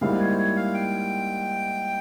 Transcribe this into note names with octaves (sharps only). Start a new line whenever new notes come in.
G#2 G3 A#3 E4 F5
C#5
C5
C#5
F5
G5